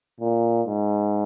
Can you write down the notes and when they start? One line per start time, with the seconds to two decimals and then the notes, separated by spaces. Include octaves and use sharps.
0.20 A#2
0.67 G#2